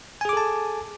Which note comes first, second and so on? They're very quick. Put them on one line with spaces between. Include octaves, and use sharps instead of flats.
G#5 G#4 D6 A4 A5